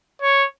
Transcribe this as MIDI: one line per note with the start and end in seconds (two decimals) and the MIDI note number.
0.22 0.45 73